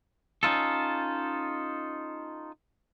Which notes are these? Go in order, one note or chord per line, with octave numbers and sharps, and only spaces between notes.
C#4 D#4 F4 A4